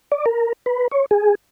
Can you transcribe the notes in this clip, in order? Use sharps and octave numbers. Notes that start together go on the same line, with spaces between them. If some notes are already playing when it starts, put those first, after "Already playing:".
D5
A#4
B4
C#5
G#4